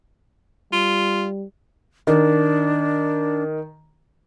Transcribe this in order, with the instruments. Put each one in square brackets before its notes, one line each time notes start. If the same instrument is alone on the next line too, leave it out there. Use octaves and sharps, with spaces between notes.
[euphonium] G3 [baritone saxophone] F4
[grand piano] D#3 [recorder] D4